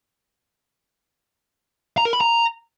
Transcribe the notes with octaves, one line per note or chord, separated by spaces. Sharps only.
A#5
A#4
B5
A#5